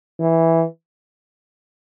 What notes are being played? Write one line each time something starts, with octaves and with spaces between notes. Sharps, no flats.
E3